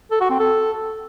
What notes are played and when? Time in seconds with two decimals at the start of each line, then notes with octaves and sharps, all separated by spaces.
0.11 A4
0.21 F#4
0.30 C4
0.39 A4